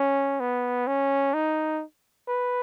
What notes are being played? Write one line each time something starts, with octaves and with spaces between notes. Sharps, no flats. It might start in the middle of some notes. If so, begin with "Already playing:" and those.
Already playing: C#4
B3
C#4
D#4
B4